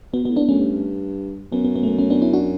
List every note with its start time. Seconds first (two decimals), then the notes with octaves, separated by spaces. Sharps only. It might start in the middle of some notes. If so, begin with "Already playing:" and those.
0.13 B2 B3
0.24 B2 B3
0.29 A2
0.36 B3 D4
0.48 F#2 A3 C#4
0.60 G2
1.52 F#2 B3
1.65 B3
1.76 B3
1.83 A3
1.87 B3
1.99 A3 C#4
2.10 B3 D4
2.22 C#4 E4
2.33 D4 F#4